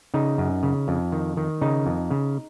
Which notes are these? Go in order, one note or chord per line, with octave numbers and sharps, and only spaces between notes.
C#3 D#4
F#2
C#3
F2
D#3
D#3
C#3 D#4
F2
C#3